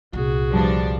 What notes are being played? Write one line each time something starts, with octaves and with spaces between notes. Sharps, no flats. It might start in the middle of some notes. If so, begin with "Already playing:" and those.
C2 A#2 F#4 G#4
G2 F3 D4